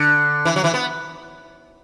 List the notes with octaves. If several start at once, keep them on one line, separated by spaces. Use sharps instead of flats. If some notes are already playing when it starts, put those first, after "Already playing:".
Already playing: D3
E3
F#3
E3
B3